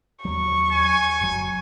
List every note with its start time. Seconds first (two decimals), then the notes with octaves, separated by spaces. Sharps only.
0.25 D#2 F#3 C#6
0.72 G#5
1.21 F#1 F#3